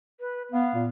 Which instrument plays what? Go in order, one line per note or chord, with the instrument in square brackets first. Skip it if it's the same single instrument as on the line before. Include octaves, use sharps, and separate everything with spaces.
[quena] B4
[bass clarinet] B3 [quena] F5
[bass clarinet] A#2